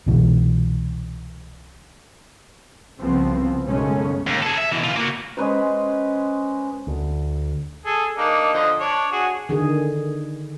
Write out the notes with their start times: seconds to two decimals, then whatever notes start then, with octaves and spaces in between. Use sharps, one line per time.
0.06 C2 B2 E3
2.98 C2 C#3 F3 B3 C4
3.67 B1 F#2 C#3 G#3 A3 C#4
4.27 D#2
4.42 G#4 A4
4.58 E5
4.71 B2 E3
4.84 E3 F4
4.96 A#3 F#4
5.37 G#3 C#4 B4 C5
6.87 D2
7.85 G#4 A4
8.18 A#3 D4 D#4
8.54 D3 F3 D#5
8.80 D4 C#5
9.12 F#4 G#4
9.49 D3 D#3 G#4